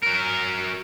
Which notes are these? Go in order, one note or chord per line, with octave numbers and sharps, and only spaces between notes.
F#3 A#4